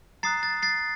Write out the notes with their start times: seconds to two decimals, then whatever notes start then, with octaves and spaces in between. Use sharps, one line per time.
0.23 A#5 D#6 F#6 A6 C7
0.43 A6
0.63 A6 C7